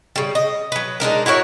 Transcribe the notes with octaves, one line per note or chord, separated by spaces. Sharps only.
C#3 G3
D#5
F#3 B4
G#3 D4 D#4 A#4
E4 F#4 A#4 C#5